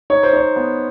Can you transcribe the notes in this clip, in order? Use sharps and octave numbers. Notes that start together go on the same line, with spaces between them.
D#4 C#5
C5
D#4 C#5
B3